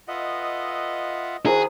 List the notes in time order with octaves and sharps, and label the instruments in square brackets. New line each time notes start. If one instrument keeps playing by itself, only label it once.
[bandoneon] F4 E5 F#5 [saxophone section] A4 B4 D#5
[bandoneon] D#3 F#4 B5 [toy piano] E4 A#4 C5 [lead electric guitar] G#4